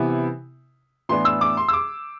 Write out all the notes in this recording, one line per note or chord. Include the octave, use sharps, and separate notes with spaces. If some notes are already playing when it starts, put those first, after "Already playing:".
Already playing: C3 E3 B3 E4
A2 E3 B3 D4 C6
E6
D6
C6
E6
D6